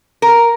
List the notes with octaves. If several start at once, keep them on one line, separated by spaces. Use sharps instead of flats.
A#4